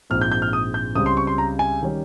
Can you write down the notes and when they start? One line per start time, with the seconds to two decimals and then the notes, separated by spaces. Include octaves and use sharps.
0.10 A#1 G#2 F3 C4 F6
0.21 G6
0.32 G6
0.42 F6
0.53 D#6
0.74 G6
0.95 C#2 C#3 G3 C4 D#6
1.06 C6
1.17 C#6
1.27 C6
1.38 A#5
1.59 G#5
1.82 D#3 G3 C#4